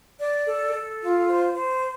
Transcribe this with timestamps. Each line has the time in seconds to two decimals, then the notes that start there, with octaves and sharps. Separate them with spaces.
0.17 D5
0.45 A4
0.72 A4
1.00 F4
1.28 C5
1.55 C5